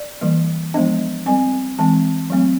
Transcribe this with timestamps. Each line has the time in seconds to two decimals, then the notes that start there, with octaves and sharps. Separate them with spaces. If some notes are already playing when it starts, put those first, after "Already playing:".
Already playing: D5
0.21 E3 G3 A#3
0.74 F3 G#3 B3 D4 D#5
1.26 G3 C4 G#5
1.79 E3 G#3 C4 A5
2.30 F#3 A3 C4